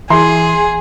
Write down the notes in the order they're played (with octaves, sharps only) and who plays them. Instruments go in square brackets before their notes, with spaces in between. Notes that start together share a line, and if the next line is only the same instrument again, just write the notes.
[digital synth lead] E3 [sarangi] G#4 [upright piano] C6